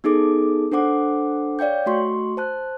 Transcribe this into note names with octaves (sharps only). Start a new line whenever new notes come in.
B3 D#4 G#4 A4 D6
D4 A4 C5 F#5 D6
C#5 D5 F5 G5 G6
A3 F#4 C6 C#6
C5 A5 F#6